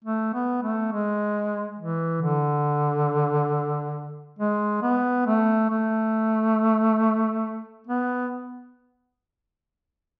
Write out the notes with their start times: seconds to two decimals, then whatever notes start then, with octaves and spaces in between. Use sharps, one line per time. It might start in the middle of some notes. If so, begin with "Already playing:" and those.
0.04 A3
0.34 B3
0.62 A3
0.92 G#3
1.79 E3
2.22 D3
4.39 G#3
4.83 B3
5.26 A3
5.70 A3
7.87 B3